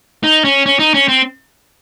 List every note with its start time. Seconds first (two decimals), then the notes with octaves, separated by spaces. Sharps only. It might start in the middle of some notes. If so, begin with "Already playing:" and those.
0.24 D#4
0.45 C#4
0.66 C#4
0.79 D#4
0.94 C#4
1.08 C4